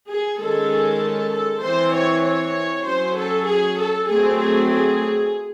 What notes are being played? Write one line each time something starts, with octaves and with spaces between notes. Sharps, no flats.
G#4
D#3 G#3 C#4 A4
A4
E3 C4 C5
C#5
C#5
F#3 C#4 C5
A4
G#4
A4
F#3 A3 C4 G#4
G#4
G#4